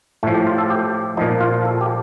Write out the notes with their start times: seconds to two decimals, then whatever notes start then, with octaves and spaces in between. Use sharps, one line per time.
0.23 A2 F3 A3
0.34 G4
0.47 F4
0.58 A4
0.70 G4
1.17 F3 D#4
1.21 A#2
1.41 F4
1.65 A4
1.81 G4